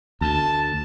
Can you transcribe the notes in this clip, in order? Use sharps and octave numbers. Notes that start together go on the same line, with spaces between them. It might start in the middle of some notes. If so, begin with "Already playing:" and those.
D2 A5